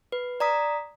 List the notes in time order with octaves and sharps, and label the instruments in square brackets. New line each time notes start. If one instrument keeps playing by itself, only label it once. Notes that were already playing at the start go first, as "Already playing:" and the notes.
[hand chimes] B4
D5 A#5 D#6 B6